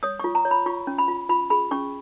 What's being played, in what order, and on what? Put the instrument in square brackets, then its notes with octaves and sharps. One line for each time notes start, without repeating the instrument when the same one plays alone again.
[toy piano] C#5 D#6
C#6
F4
A#5
C#5
B5
F4 C#6
C#4
B5
F4
F4 B5
G#4 B5
C#4 C#6